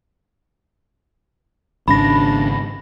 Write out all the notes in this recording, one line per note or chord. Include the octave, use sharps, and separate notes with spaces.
G#1 G#2 C#3 D4 B5 A#6